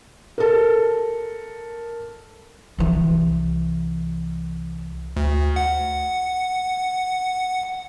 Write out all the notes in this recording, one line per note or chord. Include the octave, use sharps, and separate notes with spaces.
A4 A#4
C2 E3
D2
F#5